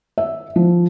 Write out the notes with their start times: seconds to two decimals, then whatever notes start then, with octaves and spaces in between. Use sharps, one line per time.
0.18 E5
0.56 F3